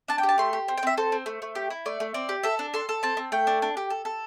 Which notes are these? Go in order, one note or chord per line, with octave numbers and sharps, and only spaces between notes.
D4 A5
G5
G4
A5
A3 C6
G4
C4
G5
C4 E5
A4 C5
C4
A3
A3
G4
E4
A3 D5
A3
C4 D5
G4
A4 E5
D4
A4 C6
A4
C4 A5
C4
A3 G5
D4
D4
G4
A4
A4